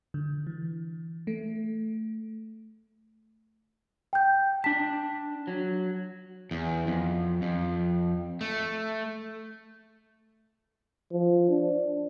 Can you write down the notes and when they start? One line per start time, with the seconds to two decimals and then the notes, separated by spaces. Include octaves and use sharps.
0.14 D3
0.47 E3
1.27 A3
4.13 G5 G6
4.64 D4 A5 B6
5.47 F#3
6.51 E2
6.87 F2
7.42 F2
8.41 A3
11.12 F3
11.49 D4